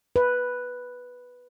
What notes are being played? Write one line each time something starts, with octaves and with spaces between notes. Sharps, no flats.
B4